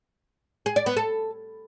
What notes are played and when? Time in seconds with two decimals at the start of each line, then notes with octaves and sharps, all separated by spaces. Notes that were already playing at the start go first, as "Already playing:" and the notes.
0.66 G#4
0.76 D5
0.86 B3
0.97 A4